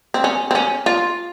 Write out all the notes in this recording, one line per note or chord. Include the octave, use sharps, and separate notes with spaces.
C4
C#4
C4
C#4
F4